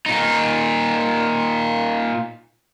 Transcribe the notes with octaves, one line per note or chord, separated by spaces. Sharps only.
A#2 D#4